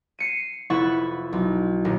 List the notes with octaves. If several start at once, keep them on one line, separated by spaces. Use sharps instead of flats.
C7 C#7 D#7
F1 E4 B4 F#5 C#6 A6
B1
D#1